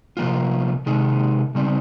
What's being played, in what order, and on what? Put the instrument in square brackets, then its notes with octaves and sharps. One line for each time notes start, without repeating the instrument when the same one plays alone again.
[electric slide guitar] C3 F3 A#3 F4
C3 D#3 G#3 D#4
C#3 G3 C4 D#4